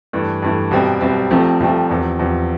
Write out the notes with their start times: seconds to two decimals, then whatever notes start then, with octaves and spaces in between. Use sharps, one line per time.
0.13 G2 E3 A3
0.42 G2 E3 A3
0.71 C2 B2 G3 C4
1.01 C2 B2 G3 C4
1.31 C2 C3 F3 A3 C4
1.60 C2 C3 F3 A3 C4
1.90 E2 C3 F3
2.19 E2 C3 F3